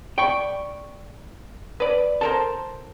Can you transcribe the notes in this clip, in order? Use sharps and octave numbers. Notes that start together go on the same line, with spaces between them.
D5 G5 B5 C#6
B4 D5
A4 A#4 C5 A5